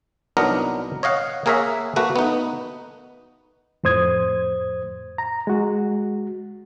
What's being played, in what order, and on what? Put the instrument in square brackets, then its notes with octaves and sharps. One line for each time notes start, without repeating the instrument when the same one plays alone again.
[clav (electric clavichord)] C2 F#3 B3 D4 D#4 A#4
C#5 D#5 F5 F#5
A#3 G#4 A#4 C#5 E5 F#5
A3 A#3 F#4 B4
B3 D#4
[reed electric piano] F2 A2 C5 D#6 G#6
A#5
G#3 F#4